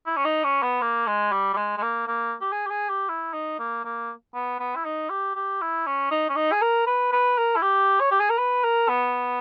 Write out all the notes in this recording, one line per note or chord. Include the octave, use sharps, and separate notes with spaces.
E4
C#4
D#4
C#4
B3
A#3
G#3
G3
G3
G#3
G#3
A#3
A#3
G4
G#4
G4
G#4
G4
E4
D#4
A#3
A#3
B3
B3
E4
D#4
G4
G4
E4
C#4
D#4
C#4
D#4
G#4
A#4
B4
B4
A#4
E4
G4
C#5
G4
G#4
A#4
B4
A#4
B3